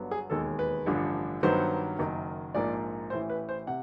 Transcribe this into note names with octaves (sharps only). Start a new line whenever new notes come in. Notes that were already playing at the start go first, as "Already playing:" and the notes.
Already playing: G1 G2 D3 F#3 B3
G#4
E1 D#2 D#3 G#3 A4
B4
A1 G2 D3 F3
G2 D#3 F#3 B3 C5
F#1 F#2 D#3
A#1 G#2 F3 A#3 D5
A1 A2 E3 C5
B4
C5
C3 F#5